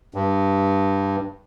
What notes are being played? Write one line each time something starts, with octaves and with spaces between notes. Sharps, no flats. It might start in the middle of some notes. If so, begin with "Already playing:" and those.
G2